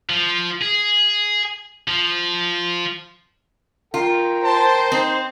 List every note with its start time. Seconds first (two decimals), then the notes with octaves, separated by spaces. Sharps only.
0.09 F3
0.62 G#4
1.88 F3
3.94 F4 A#4 G5
4.44 C5 A5
4.92 C4 D#4